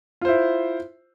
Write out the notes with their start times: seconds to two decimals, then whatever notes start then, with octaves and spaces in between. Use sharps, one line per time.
0.21 F4
0.25 C5
0.28 E4